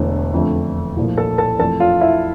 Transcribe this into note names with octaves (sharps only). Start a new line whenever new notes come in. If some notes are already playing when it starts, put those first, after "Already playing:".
Already playing: E1 E2 D3 A3
F2 D3 A3
C2 A#2 F3 A3
A4 A5
A4 A5
F2 E3 A3 A4 A5
F4 F5
E4 E5